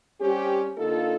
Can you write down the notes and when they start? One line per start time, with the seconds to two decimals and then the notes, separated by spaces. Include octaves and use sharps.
0.20 G3 C4 C#4 G4
0.78 D3 A#3 D#4 F4 A4